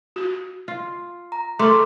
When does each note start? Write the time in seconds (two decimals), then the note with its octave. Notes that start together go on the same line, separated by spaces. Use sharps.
0.16 F#4
0.68 F4
1.32 A#5
1.59 A3 A4 C6 D6